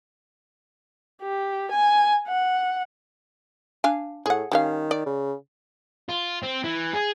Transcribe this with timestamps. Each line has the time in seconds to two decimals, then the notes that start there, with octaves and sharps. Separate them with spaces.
1.22 G4
1.72 G#5
2.28 F#5
3.84 D4 F5 G#5
4.26 A2 G#4 F#5
4.52 D#3 G3 C#4 F5
4.91 D5
5.06 C#3
6.09 F4
6.43 C4
6.64 E3
6.93 G#4